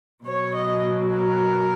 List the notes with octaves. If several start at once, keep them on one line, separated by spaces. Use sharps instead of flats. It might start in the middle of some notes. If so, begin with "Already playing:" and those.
B2 F#3 C#5
D#5
A#4